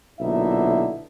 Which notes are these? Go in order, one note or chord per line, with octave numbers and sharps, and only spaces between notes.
B1 A#2 D3 D#4 E4 E5